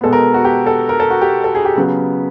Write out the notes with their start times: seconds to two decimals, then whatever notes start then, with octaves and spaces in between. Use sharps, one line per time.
0.01 B2 G#3 B3 A4
0.13 A#4
0.34 F#4
0.45 G4
0.66 A4
0.89 A#4
1.00 A4
1.10 F#4
1.22 G4
1.44 A4
1.55 G#4
1.65 G4
1.76 C#3 F#3 B3